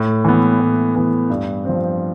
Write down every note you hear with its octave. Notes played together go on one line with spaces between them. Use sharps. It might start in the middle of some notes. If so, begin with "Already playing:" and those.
Already playing: A2
E3 B3
A2
E3 B3
G2
F3 C4